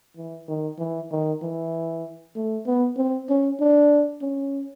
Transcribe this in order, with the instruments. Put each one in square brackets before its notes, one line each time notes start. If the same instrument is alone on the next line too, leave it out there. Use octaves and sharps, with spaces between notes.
[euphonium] E3
D#3
E3
D#3
E3
A3
B3
C4
C#4
D4
C#4